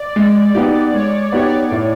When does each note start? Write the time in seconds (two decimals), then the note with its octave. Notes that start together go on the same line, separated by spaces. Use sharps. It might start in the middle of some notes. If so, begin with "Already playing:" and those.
Already playing: D5
0.16 G#3
0.55 B3 D#4 G4
0.93 G#3 C#5
1.19 C#5
1.32 B3 D#4 G4 C#5
1.45 D5
1.71 A2